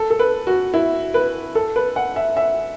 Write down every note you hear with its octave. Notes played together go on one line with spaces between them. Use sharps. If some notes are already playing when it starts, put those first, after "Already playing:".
Already playing: A4
A4
B4
F#4
E4
B4
A4
B4
F#5
E5
E5